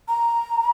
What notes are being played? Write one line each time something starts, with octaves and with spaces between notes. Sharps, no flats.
A#5